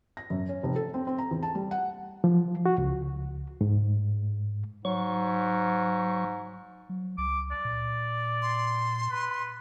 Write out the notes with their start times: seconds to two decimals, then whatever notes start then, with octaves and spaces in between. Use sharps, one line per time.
0.17 A#6
0.30 F#2
0.49 C#4
0.63 F1
0.76 A4
0.94 C4
1.07 C4
1.18 A#5
1.31 E2
1.43 A5
1.55 G3
1.71 F#5
2.24 F3
2.66 F#4
2.78 C#2
3.61 G#2
4.85 G#2 F#3 C#6
6.89 F#3
7.18 C#2 D6
7.51 D5
7.65 A#2
8.42 C6
9.10 B4